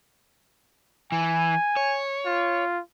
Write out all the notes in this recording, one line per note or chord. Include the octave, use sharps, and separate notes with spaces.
E3 G#5
C#5
F4